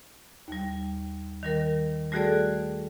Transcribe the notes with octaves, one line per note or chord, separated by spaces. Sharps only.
D#2 G3
D#3 G3 A#4
G3 A3 F#4 G#4 A4 D5